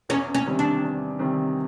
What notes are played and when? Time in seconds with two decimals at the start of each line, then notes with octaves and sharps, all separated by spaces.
0.09 E2 C#4
0.35 C#4
0.46 C3 D#3 G3 C4
0.59 D4
0.83 E2
1.19 C3 D#3 G3 C4